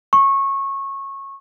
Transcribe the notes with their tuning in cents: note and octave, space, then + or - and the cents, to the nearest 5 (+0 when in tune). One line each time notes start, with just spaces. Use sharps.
C#6 -20